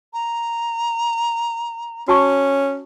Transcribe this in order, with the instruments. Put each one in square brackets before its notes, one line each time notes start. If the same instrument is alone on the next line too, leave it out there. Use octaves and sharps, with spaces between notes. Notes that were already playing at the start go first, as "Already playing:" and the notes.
[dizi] A#5
[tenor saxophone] C#4 [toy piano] F#4 A5 C#6